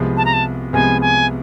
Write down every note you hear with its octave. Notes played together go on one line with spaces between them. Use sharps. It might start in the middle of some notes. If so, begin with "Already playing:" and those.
Already playing: C2 C3 F3 G#3 B3
A5
A#5
A5
C2 C3 F3 G#3 B3 G#5
G#5